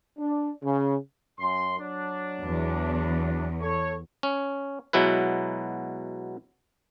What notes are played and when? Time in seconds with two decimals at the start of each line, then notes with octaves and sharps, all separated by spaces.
0.19 D4
0.64 C#3
1.39 F#2 C6
1.78 F#3 D4
2.43 E2
3.60 A4 C#5
4.23 C#4
4.93 B2 F#3 G#3 E4 B4